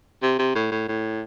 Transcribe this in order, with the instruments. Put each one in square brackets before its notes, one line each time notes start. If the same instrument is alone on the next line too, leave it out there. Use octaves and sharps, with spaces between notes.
[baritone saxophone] C3
C3
A2
A2
A2